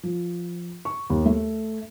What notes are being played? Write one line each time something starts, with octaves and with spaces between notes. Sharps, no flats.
F3
C#6
D#2
A3